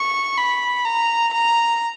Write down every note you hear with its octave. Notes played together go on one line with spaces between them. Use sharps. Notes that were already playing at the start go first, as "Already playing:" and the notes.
Already playing: C#6
B5
A#5
A#5